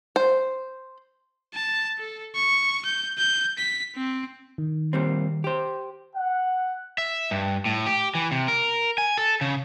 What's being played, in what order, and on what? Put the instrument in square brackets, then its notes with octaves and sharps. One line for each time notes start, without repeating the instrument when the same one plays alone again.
[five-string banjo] C5
[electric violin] A5
A4
C#6
G6
G6
B6
C4
[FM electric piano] D#3
[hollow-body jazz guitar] A#2 G3 C4
G4 C5
[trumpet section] F#5
[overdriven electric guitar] E5
G2
A2
G4
E3
C3
A#4
G#5
A4
C#3